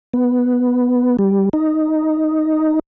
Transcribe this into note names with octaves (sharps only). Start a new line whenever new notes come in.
B3
G3
D#4